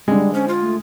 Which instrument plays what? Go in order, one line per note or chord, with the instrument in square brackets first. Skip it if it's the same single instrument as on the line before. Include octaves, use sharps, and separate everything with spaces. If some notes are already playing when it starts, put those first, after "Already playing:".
[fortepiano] D3 G#3 [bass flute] G3
[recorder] C#4 [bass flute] C5
[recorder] F4
[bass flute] A3